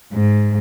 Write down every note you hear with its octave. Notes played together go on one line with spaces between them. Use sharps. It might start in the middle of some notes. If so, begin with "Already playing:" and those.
G#2